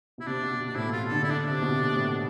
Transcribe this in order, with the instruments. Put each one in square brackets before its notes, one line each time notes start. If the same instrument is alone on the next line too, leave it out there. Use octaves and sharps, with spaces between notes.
[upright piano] B2 [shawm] E4
[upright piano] C3 [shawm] D4
[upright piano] B2
B2
[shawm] D4
[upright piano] A2 [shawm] E4
[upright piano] B2
[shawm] F4
[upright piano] C3
[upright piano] D3 [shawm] A4
[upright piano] D3 [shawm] E4
[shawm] D4
[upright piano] C3 [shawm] D4
[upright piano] B2
C3
A2